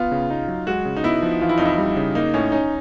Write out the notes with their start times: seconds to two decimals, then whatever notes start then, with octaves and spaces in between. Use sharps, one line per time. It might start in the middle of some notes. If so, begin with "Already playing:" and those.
Already playing: B3 F4
0.12 C#3
0.30 D#4
0.48 F#3
0.67 G#3 F#4
0.85 C#3
0.97 D#4
1.04 B3 E4
1.22 F3
1.41 E3 F4
1.49 E4
1.58 F2 D#4
1.65 E4
1.78 G3
1.96 C#3
2.15 A#3 D#4
2.34 A2 C#4
2.52 C#4 D#4